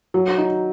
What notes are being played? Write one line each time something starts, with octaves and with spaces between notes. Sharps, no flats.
F#3
D#4